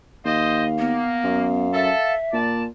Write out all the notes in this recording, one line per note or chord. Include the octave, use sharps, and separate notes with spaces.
D#2 C5 D#5 F5
A#3 B3
F#2
A4 E5
A#2 D5 A5